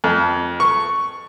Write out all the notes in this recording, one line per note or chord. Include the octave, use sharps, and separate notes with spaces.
F2
C#6